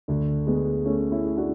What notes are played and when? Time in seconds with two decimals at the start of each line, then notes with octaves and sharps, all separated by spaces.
0.08 D2 D3
0.47 G#3 B3
0.85 A3 C#4
1.12 C#4 E4
1.26 G#4
1.37 D4 F#4